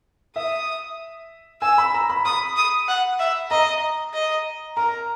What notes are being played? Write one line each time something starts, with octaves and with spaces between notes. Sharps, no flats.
E5 D#6
G#5 E6
B5
A#5
B5
B5 D#6
D#6
F#5
E5
D#5 A#5
D#5
A#4 A#5